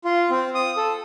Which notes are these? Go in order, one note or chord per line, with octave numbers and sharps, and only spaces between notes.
F4
C4
D#6
A4